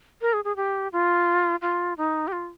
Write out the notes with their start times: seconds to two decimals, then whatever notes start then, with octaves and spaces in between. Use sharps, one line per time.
0.22 A#4
0.33 G#4
0.45 G#4
0.56 G4
0.92 F4
1.62 F4
1.97 D#4
2.28 G4
2.32 F4